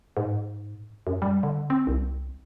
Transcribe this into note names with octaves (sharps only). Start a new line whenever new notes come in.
G#2
F#2
G3
D3
C4
C2